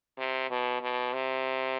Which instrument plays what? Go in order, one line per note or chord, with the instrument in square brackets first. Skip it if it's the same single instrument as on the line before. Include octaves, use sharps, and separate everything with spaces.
[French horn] C3
B2
B2
C3